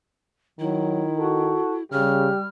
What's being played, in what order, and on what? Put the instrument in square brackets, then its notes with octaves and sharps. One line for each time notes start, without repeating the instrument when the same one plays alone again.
[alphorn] D#3 [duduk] F#3 [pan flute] E4
[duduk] F#4 [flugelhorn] A4
[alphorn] C#3 [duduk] G3 [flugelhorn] G4 [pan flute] F6